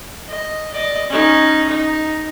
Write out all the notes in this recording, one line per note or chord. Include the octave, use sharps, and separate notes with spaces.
D#5
D5 D#5
C#4 D#4
D#4